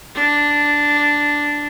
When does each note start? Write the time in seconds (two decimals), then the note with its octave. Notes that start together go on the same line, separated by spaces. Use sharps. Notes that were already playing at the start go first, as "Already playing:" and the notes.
0.15 D4